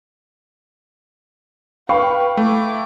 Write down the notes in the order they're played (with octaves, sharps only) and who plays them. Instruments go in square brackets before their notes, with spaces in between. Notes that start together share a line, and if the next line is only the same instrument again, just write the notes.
[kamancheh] B4 [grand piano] F5 [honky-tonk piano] G5 B5 C#6
[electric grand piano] A3 [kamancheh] E4 D6